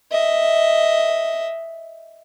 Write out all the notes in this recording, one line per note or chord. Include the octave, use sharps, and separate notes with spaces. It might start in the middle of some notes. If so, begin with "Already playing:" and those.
D#5 E5